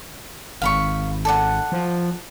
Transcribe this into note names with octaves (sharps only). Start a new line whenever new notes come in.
G#1 F5 B5 C#6
A4 D5 F#5
F3